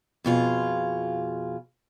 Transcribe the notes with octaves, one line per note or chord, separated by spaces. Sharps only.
F2 B2 F4 G#4